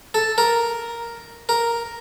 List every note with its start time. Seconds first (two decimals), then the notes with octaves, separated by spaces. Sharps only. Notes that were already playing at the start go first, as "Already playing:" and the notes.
0.14 A4
0.38 A#4
1.49 A#4